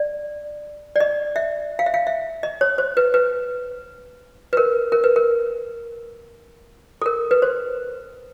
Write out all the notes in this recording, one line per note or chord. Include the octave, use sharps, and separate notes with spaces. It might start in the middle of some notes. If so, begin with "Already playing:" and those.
Already playing: D5
D5
D#5
E5
F5
E5
F5
E5
D#5
C#5
C5
B4
B4
B4
A#4
A#4
B4
A#4
A4
A#4
B4
C5